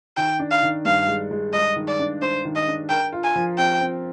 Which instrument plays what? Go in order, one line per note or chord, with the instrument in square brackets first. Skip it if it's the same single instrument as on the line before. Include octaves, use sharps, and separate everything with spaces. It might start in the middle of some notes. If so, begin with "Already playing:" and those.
[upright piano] D#3 [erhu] G5
[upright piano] D4
[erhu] F5
[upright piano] D#3
[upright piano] G2 [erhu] F5
[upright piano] G#3
G#3
[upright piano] G#3 [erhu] D#5
[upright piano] D#3
[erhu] D5
[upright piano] D4
[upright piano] D4 [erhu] C5
[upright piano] D#3
[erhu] D#5
[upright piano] D4
[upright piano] A#4 [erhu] G5
[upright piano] F4
[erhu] G#5
[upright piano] F3
[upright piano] C4 [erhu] G5
[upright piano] C4